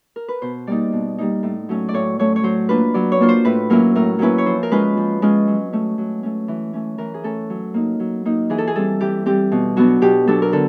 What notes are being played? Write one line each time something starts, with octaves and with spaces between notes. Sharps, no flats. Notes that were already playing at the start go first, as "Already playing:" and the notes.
A#4
B4
B2 C5
G3 A#3 D#4 D5
B2
G3 A#3 D#4
A2
F#3 A3 C#4
D5
A2 C#5
F#3 A3 C#4 C#5
C#5
F#3 C5
A#3 D4 F4 B4
F#3 D5
C#5
A#3 D4 F4
C5
A2 B4
F#3 A#3 C#4 E4 A#4
A2 A#4
F#3 A#3 C#4 E4 B4
C#5
F3 C5
A#4
G#3 C#4 F4 B4
F3
G#3 C#4 F4
F#3
A3 C#4
F#3
A3 C#4
E3
A3 C#4
E3 A#4
G#4
A3 C#4 A4
F#3
A#3 D#4
F#3
A#3 D#4
E3 G#4
A4
G#4
G3 C4 A4
E3 G4
G3 C4 G4
B2
F#3 B3 D4 F#4
B2 G4
F#3 B3 D4 A4
A#4
D3 A4